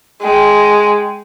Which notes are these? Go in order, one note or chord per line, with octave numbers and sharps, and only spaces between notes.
G#3 G5